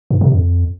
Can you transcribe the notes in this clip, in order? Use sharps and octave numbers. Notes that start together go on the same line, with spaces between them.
G2
C3
F2